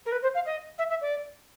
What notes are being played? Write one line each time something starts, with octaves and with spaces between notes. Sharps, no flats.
A#4
B4
C5
F5
D#5
E5
E5
D5